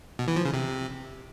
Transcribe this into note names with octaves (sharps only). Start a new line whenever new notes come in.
B2
E3
F3
C#3
C3